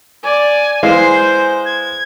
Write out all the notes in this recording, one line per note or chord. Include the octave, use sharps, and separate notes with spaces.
D5 G#5
E3 G#3 C5 F5 G#5 C7
G6
G#6